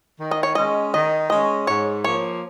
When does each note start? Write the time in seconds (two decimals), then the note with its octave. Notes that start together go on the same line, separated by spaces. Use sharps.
0.19 D#3
0.31 D#5
0.43 C#5
0.55 G#3 C#4 D#5
0.93 D#3 D#5
1.30 G#3 C#4 D#5
1.67 G#2 C#5
2.04 F3 A#3 C#5